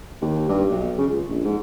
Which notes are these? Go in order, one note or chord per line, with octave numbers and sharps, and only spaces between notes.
D#2
G2
B1
C#3
C#2
A#1
G#2